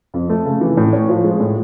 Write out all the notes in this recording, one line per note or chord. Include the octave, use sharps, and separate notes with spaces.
F2
A3
C#3
E3
A2
C#4
F3
G#3
A2